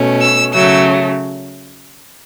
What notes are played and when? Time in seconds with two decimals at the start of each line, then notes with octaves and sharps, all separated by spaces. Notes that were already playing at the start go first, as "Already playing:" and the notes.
Already playing: B2 A3 C#4
0.21 E6
0.53 C#3 F#3 A3 E6